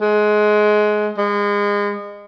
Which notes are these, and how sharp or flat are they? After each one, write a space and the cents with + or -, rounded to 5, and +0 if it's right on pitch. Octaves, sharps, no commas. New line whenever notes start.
G#3 +20
G#3 -30